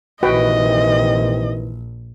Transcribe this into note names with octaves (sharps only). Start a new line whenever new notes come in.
A#1 C3 D#3 E3 F#4 B4 D#5 G5